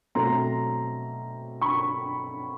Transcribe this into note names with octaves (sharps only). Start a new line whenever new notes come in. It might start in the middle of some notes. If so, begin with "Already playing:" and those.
B2 F#3 A3 C4 A#5 C6
B5 C#6